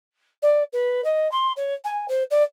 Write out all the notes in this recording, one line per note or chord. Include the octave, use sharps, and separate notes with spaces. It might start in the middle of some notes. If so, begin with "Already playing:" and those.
D5
B4
D#5
C6
C#5
G#5
C5
D5